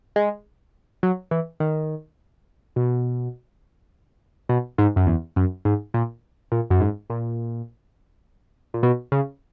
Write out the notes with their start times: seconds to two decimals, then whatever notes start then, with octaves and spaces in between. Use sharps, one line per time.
0.16 G#3
1.03 F#3
1.31 E3
1.60 D#3
2.76 B2
4.49 B2
4.78 G#2
4.96 F#2
5.07 E2
5.36 F#2
5.65 G#2
5.94 A#2
6.52 A#2
6.70 F#2
6.81 G#2
7.10 A#2
8.74 A#2
8.83 B2
9.12 C#3